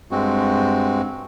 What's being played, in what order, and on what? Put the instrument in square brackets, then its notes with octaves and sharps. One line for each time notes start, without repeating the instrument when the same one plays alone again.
[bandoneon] G2 G#3 C4 F#4